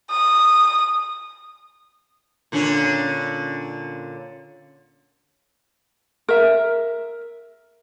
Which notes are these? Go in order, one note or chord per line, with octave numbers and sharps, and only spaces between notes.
D#6
A#2 D3 C#4
A#4 E5